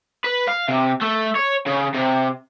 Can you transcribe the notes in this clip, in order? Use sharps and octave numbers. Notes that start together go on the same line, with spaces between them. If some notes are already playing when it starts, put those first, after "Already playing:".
B4
F5
C3
A3
C#5
C#3
C3